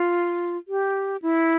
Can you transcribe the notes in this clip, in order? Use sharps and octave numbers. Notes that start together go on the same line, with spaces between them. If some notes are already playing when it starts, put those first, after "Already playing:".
Already playing: F4
G4
E4